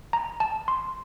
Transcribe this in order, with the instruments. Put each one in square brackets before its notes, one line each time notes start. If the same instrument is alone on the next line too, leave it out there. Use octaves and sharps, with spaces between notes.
[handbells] A#5
A5
C6